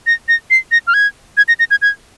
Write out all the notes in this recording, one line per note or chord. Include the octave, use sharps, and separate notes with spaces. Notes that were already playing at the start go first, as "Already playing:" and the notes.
A#6
A#6
C7
A#6
F6
G#6
G#6
A#6
A#6
G#6
G#6